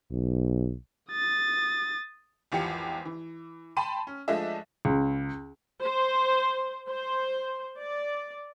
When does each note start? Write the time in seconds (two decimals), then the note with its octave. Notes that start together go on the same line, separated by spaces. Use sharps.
0.12 B1
1.11 D#6 A6
2.52 G#1 E2 F3 G4 C#7
3.05 E3
3.77 G5 A5 B5 C6 D#7
4.07 C#4
4.28 F3 G#3 A3 D4 D#5 E5
4.85 C#2
5.80 C5
6.91 C5
7.78 D5